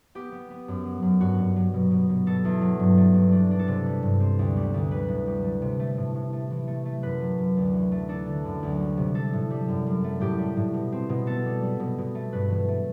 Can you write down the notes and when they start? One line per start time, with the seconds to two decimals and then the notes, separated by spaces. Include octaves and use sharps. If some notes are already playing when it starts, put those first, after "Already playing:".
0.15 B3 G4
0.32 B3
0.51 B3
0.68 F#2
0.85 F#3
1.02 F#2
1.21 G2 F#4
1.38 G2
1.56 F#3
1.73 B2
1.91 B2
2.09 B2
2.27 B2 A4
2.45 E2
2.61 F#3
2.80 G2
2.97 A3
3.14 G2
3.32 D4
3.51 D4
3.59 A4
3.68 C3
3.86 G3
4.03 G2
4.20 C4
4.39 D2
4.57 G3
4.74 D2
4.91 G3 B4
5.09 A2
5.27 G3
5.44 A3
5.62 C3
5.79 A3
5.97 A2
6.15 A2
6.33 A3
6.51 E3
6.67 A3
6.85 A3
7.03 F#2 B4
7.20 F#3
7.38 F#2
7.57 D2
7.74 E3
7.92 A3
8.08 D4 A4
8.26 D3
8.44 F#2
8.63 D2
8.80 G3
8.97 C3
9.15 G3 A4
9.33 A2
9.50 G3
9.68 F#2
9.86 F#2
10.04 A3
10.21 A2 G4
10.38 G3
10.57 A2
10.74 B2
10.92 C4
11.09 B2
11.27 B3 A4
11.45 G3
11.63 G3
11.80 B2
11.98 B2
12.15 A3
12.33 G2 B4
12.50 E3
12.68 A3